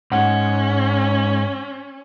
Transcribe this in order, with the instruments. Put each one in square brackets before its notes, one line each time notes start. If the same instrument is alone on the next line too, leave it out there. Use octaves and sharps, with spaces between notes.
[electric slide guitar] G#2 [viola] C#4 [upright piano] F#5